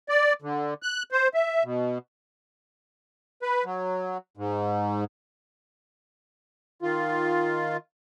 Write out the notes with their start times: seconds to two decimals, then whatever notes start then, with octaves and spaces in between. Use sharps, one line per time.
0.09 D5
0.42 D3
0.83 F#6
1.12 C5
1.34 E5
1.63 B2
3.42 B4
3.64 F#3
4.37 G#2
6.82 D#3 F4